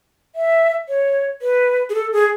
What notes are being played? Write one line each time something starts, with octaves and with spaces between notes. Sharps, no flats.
E5
C#5
B4
G#4
A4
G#4